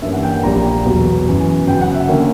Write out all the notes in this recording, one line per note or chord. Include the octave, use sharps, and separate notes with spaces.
G2 E3 A#3 C#4 E5
F#5
G5
G5
A#1 A#2 G3 A#5
E2 B2 F#3
F#2 E3 B3
F#2 C#3 F#3 G5
F#5
E5
D3 A#3 C#4